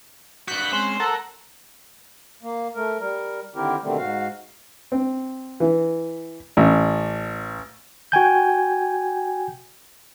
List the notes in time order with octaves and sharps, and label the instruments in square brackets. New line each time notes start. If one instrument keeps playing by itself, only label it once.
[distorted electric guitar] G2 F#4 [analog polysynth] F#6 G6 B6
[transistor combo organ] G#3 C4 C#4 [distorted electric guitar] C5
[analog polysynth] A4 [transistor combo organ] A#4 F#5 A#5
[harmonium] A#3
A3 A#4
G3 A#4
D3 D#3 C4 E4 G4 A#4
B2 D3 D#3 G3 A3 C4
G#2 F#4 F5
[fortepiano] C4
E3
A1
[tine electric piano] F#4 G5 G#5 G6